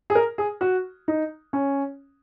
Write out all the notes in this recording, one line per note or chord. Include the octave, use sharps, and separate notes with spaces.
G#4
A#4
G#4
F#4
D#4
C#4